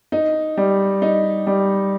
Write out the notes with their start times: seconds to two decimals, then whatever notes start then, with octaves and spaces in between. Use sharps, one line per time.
0.12 D#4
0.57 G3
1.02 D#4
1.47 G3